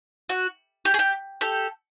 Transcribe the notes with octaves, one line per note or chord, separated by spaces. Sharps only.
F#4
G4
G#4
G4
G4 A4